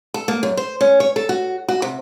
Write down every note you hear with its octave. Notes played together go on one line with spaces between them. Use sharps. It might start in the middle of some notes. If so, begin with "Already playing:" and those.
A4
A#3
F#2
C5
C#4
C#5
A4
F#4
F#4
C3